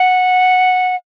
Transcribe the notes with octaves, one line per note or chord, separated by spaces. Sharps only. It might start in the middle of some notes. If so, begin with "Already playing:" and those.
Already playing: F#5